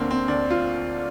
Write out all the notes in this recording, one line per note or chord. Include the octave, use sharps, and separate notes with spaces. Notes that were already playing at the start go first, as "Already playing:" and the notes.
Already playing: D2 D3 A#3 C4
C4
D2 D4
F4